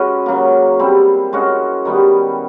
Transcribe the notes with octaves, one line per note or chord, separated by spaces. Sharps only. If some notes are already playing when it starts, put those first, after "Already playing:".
Already playing: G#3 C#4 F#4 B4
C#3 F#3 A#3
G3 C4 E4
G#3 C#4 F#4
D#3 G3 B3